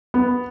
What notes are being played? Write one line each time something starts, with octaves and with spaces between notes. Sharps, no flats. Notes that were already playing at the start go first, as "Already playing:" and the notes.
B3